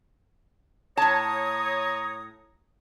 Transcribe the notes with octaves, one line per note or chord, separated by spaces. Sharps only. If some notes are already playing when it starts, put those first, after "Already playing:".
A2 C#5 A5 A#5 D#6